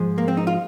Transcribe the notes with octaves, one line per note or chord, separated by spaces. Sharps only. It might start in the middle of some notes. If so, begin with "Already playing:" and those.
Already playing: G#2 F3 G#3
A#3
C4
D#4
F4